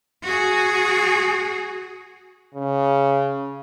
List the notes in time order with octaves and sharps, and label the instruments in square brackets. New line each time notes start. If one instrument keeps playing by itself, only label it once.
[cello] F#4 G#4
[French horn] C#3